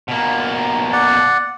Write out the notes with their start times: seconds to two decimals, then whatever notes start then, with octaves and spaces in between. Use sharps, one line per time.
0.08 B2 A#3
0.93 D5 F#5